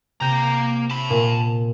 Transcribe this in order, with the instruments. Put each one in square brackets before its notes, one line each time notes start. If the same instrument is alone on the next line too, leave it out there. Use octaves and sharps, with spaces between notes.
[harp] C3 G6 [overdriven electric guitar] A#3 A#5
[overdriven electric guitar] A5 B5
[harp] A#2